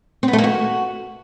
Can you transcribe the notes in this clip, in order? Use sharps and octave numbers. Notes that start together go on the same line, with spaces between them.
C4
B3
A3
A#3
F#4